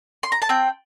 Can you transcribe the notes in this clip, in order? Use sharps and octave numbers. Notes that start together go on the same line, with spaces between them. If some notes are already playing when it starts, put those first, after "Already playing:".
C6
A#5
A5
C4 G5